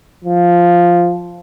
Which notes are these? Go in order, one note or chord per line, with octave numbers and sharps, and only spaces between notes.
F3